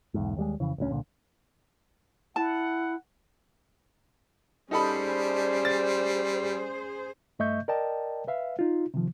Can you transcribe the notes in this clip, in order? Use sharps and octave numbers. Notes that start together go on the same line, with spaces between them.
B1 E2 G#2
D#2 G3 G#3
F2 C#3 E3
D#1 D2 C#4
C2 A#2 D3
E4 F#5 A5
G3 C#4 D#4 G#4 A4 C5 D5 B5
A6
G2 A3 D#5 E5 C#6 G6
A#4 D5 D#5 G5 A5
B4 E5 F5
D#4 F4
C3 D#3 F3